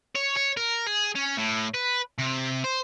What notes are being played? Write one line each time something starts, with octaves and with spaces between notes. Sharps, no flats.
C#5
C#5
A#4
G#4
C#4
A2
B4
C3
C5